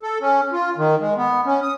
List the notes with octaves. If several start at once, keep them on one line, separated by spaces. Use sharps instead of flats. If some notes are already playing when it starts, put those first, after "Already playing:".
A4
C#4
F4
D#3
G#3
B3
C#4
D#6